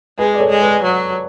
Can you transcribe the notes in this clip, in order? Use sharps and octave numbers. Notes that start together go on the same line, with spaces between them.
G#3 G#4 B4
D5
A4 C#5
G#3
B4 D5
F#3